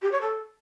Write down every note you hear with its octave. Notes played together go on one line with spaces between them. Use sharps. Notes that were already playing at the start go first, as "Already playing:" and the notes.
G4
C#5
A4